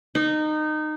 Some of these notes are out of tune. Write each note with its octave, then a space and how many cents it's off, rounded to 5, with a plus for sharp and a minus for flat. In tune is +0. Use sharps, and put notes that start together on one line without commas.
D#4 -20